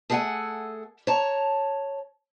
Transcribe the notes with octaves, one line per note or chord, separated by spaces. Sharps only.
A3 G#4 A4 F5 F#5 G#5
C#5 A5 A#5